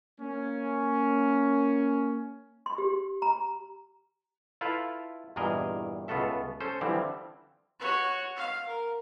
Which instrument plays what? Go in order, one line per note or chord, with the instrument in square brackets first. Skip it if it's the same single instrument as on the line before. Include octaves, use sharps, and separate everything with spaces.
[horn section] A#3 C#4
[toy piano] C6
G4
A#5
[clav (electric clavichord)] E4 F4 A4 B4 E5 F5
E2 G2 A#2 G#4 A#4 D#5
C#2 B3 F4 F#4 A4 E5
C#4 A4 C5
D3 E3 F3 G3 C4
[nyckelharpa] F#4 C#5
F5
A#4